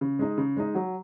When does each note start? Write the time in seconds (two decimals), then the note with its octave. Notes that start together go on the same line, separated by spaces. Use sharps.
0.01 C#3
0.19 G#3 D#4
0.38 C#3
0.57 G#3 D#4
0.75 F#3